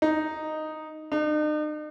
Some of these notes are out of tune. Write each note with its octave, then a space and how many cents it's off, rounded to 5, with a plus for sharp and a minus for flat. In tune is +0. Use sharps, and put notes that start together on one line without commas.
D#4 -5
D#4 -45